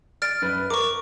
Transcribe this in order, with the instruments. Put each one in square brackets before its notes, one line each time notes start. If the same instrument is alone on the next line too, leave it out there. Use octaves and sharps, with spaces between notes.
[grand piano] D5 [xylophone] F6 A6 D7
[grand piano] F#2 B4 B5
[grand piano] A#4 [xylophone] C#6 D6